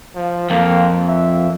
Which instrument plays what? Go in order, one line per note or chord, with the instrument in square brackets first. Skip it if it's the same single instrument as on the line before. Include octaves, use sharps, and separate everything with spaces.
[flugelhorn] F3
[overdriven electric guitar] F2 [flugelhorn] A#3
[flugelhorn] E5